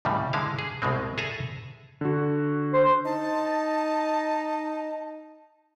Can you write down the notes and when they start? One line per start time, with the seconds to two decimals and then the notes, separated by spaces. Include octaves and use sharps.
0.05 D#2 A2 C#3 G3
0.33 D3 G#3 E4 F5
0.59 G#4
0.82 C2 B2 G#3 C4
1.18 G#4 A4 E5 G#5 A#5
2.01 D3 F#4
2.73 C5
3.05 D#4 A5